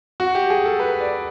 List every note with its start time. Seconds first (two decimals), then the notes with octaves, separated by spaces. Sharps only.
0.20 F#4
0.35 G4
0.50 G#4
0.65 A4
0.80 B4
1.00 D5